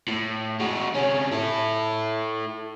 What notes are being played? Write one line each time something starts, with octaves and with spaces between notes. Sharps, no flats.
A2
G#3 F#4
C3 C#4
E4 A4